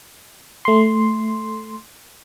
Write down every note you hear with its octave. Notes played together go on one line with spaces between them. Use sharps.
A3 C6